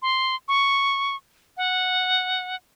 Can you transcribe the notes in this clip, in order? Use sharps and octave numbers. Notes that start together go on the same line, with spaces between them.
C6
C#6
F#5